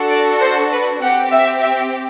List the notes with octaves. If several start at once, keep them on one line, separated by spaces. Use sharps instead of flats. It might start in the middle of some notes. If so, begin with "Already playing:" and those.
Already playing: D4 F#4 A4
D5
C5
B4
C4 G4 F#5
E5
E5